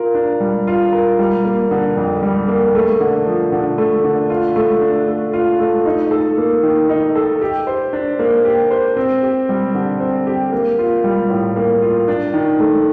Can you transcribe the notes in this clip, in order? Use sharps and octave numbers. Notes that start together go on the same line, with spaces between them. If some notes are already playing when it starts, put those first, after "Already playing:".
Already playing: F4 A#4
D4
G3
F4
A#4
G3
A#3
D3
F2
G3
A#3
A3
D3
F3
D3
A3
D3
F4
A3
D4
A3
F4
A3
D#4
A4
A#3
D#3
D#4
A4
G4
C5
D4
A#3
G4
C5
C4
G4
G3
D3
C4
G4
A#3
F4
G3
A2
A#3
F4
D4
D#3
A3